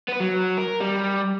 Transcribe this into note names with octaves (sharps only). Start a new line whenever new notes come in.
B3 B4
F#3
A#4
G3